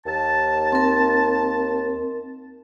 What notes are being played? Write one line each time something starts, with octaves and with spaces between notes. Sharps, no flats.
D#2 A5
C4 A#4